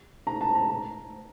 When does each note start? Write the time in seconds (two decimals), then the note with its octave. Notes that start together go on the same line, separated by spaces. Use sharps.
0.27 A#5
0.41 A5
0.55 A#5
0.70 A#5